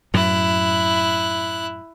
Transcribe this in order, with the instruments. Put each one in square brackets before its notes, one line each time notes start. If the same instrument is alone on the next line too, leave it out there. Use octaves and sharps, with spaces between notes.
[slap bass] F#2 A2 F#3 [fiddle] E4 F#6